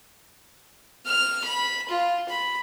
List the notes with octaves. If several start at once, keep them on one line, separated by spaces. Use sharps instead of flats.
F6
B5
F4
B5